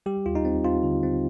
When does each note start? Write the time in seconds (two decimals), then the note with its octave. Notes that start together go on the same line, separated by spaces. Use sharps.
0.06 G3 G4
0.26 D#2 F4
0.35 D#4
0.45 C4
0.64 C4 F4
0.83 D3
1.03 C4